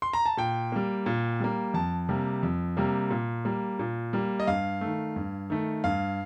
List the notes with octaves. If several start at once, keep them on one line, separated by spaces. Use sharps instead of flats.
C6
A#5
A5
A#2 G5
G3 A#3
A#2
G3 A#3
F2 A5
C3 G3 A#3
F2
C3 G3 A#3
A#2
G3 A#3
A#2
G3 A#3
D#5
G2 F5
D#3 A3
G2
D#3 A3
G2 F5